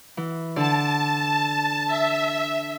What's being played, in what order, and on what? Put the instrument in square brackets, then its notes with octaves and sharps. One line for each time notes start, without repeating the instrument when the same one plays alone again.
[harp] E3
[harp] D3 D5 [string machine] A5
[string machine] E5